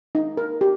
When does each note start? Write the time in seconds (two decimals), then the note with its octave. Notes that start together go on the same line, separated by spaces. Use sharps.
0.15 D#4
0.37 A#4
0.61 G4